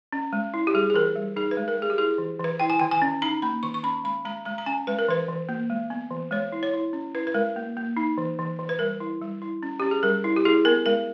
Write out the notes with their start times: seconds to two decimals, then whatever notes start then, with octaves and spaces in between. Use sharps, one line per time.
0.13 C#4
0.33 G#3
0.54 E4
0.67 G4
0.74 G3 G#4
0.90 G#4
0.94 E3 A#4
1.16 G3
1.36 D#4 G#4
1.51 B4
1.57 G#3
1.68 A#4
1.77 G#3 G#4
1.90 G4
1.98 E4 G#4
2.18 E3
2.40 E3 B4
2.60 E4 G5
2.70 G#5
2.79 D#3 G5
2.91 G#5
3.02 C#4
3.22 D#4 A#5
3.42 A#3 B5
3.63 D#3 C#6
3.74 C#6
3.83 C#4 B5
4.04 G#3 B5
4.25 G#3 A#5
4.45 G#3 A#5
4.58 A#5
4.66 C#4 G#5
4.87 G#3 B4
4.99 A#4
5.09 E3 B4
5.29 E3
5.49 A#3
5.70 G#3
5.90 B3
6.11 E3
6.31 G#3 C#5
6.52 E4
6.63 C#5
6.73 E4
6.93 C#4
7.15 E4 B4
7.27 B4
7.34 G#3 A#4
7.56 A#3
7.77 A#3
7.97 D#4
8.18 E3
8.39 E3
8.59 E3
8.69 B4
8.79 G3 A#4
9.00 E4
9.21 G3
9.42 E4
9.63 C#4
9.80 C#4 G4
9.91 G#4
10.03 G3 A#4
10.24 E4
10.36 G4
10.45 E4 G#4
10.65 B3 A#4
10.86 G#3 A#4